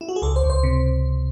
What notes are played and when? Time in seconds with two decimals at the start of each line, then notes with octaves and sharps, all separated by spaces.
0.01 E4
0.09 F#4
0.16 G#4
0.22 C#2 A4
0.36 C5
0.43 C#2
0.50 C5
0.63 C3